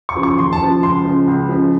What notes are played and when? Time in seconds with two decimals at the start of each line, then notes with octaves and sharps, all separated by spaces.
0.09 C#6
0.15 C#3 F3
0.23 C#6
0.38 D#2 C6
0.53 A5
0.61 C#3 F3
0.83 C#2 C6
1.05 C#3 F3
1.28 C#2
1.49 C#3 F3